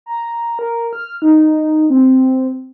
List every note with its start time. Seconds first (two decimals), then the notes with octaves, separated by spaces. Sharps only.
0.06 A#5
0.59 A#4
0.93 F6
1.22 D#4
1.90 C4